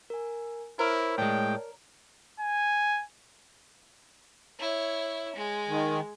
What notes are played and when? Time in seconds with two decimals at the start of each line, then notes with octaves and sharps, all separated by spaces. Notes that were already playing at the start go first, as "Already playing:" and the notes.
0.10 A#4 G#5
0.79 E4 A#4 C5 C#5 C#6
1.18 A2 G#3 C#5 D5 G5 A5
2.40 G#5
4.60 E4 C#5
5.36 G#3
5.68 D#3